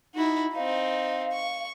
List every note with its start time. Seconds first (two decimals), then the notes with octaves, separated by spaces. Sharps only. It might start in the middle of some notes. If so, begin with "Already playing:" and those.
0.15 D#4 E4 F#4
0.54 C4 D#4 F5
1.33 C#6